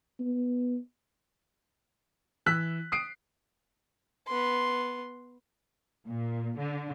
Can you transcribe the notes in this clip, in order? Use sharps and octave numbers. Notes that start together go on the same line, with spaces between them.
B3
E3 E6 F#6 B6
D#6 C7 D7
B3 C6
A#2
D3